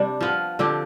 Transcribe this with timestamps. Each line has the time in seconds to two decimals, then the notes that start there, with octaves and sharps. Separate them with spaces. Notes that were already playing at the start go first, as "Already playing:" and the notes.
Already playing: C3 G3 C4 D4
0.21 F3 B3 F4
0.59 D3 F3 C4 G4